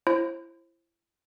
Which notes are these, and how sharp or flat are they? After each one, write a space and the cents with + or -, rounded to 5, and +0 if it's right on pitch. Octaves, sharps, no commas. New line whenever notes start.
E4 +35 C5 +30